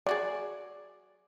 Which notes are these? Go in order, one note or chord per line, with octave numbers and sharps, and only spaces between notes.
F#3 F#4 G#4 D5